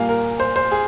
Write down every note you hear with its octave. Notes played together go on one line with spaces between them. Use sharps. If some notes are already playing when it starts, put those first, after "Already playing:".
Already playing: A#2 G3 A#3 F5 G#5
A#4
C5
C5
G#4